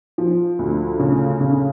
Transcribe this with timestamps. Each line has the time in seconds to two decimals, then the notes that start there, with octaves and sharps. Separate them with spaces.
0.18 F3
0.59 D2
0.99 C#3
1.40 C#3